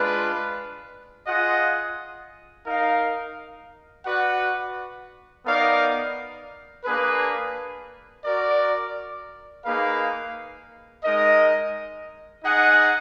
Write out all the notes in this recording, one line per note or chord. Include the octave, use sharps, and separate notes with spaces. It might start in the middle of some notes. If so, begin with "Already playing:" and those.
Already playing: G#3 D4 F4 B4
F4 G#4 D#5 F#5
D#4 A#4 F5
F#4 B4 D5 F#5
B3 D#4 A#4 D5 F5
A#3 D4 G#4 B4
F#4 A#4 D5
A#3 D#4 G#4 B4 F5
G#3 D#4 A#4 D#5
D#4 G#4 D#5 F#5